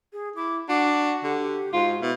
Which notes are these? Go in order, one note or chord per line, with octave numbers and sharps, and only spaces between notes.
G#4
E4 D6
D4 F#4 D6
D3 G4
G#2 F4 F#4
B2 E4